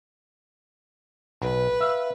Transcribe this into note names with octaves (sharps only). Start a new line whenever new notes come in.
B1 B4
E5 F5